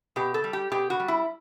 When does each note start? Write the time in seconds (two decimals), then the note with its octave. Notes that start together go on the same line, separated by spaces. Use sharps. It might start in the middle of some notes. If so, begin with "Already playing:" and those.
0.16 B2 G4
0.34 A4
0.44 G3
0.53 G4
0.72 B2 G4
0.90 F#4
1.00 G3
1.08 E4